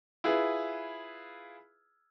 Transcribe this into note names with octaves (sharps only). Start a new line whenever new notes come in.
E4 F4 G#4 B4